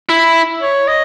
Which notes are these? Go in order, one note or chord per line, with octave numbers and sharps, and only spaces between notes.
E4
C#5
D#5